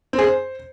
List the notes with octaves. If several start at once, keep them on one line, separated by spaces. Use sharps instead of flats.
C4
G#4
C5